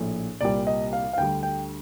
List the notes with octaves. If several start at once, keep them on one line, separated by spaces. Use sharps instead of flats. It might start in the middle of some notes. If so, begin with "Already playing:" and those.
Already playing: A#1 A2 F3
C2 A#2 G3 D5
D#5
F5
F5
D2 D3 G3 G5
G5